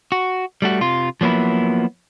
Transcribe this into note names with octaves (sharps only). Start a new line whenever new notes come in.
F#4
G3 A3 F#4
C3 F4
F3 F#3 A#3 B3 E4